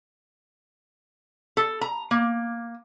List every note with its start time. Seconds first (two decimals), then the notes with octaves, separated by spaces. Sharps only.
1.57 A4
1.81 A#5
2.11 A#3